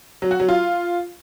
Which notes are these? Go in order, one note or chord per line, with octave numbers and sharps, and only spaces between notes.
F#3
F#4
F#3
F4